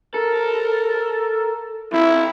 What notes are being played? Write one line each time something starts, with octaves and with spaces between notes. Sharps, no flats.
A4 A#4
F2 E4